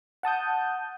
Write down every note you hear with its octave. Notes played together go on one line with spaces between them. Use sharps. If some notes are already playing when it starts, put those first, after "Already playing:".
F#5 A5 D#6 G6